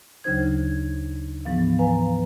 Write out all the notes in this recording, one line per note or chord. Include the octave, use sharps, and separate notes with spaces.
D2 C#3 F#3 D#4 C5 G#6
G#2 E3 F3 B3 F5
B4 F5 G#5 A#5